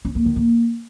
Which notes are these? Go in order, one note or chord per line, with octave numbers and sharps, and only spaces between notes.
C#4
A#3
D#3
A#3